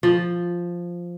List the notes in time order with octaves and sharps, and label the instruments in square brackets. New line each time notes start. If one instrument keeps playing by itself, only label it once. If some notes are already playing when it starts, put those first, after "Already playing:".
[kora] F3